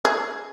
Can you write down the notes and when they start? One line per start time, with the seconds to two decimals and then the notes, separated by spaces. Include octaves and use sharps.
0.05 G#4